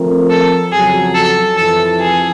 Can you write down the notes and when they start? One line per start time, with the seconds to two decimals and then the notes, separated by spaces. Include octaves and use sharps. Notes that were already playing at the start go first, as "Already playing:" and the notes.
Already playing: F3 A3 C4 F4 A#4
0.30 A4
0.72 F2 C#3 F#3 G#4
1.15 A4
1.57 F2 C3 E3 A4
2.00 G#4